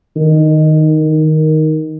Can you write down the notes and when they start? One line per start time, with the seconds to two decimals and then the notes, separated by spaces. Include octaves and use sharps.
0.16 D#3
1.01 D#3